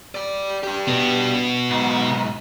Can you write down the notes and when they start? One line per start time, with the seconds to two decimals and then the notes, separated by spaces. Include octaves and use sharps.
0.15 G4 D5
0.63 D4 G4
0.88 B2 B3
1.70 B1 G#2